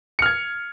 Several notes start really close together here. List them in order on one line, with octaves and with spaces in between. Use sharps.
C#7 F6 G#6